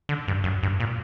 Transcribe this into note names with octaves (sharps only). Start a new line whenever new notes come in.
D3
G2
F#2
G2
A#2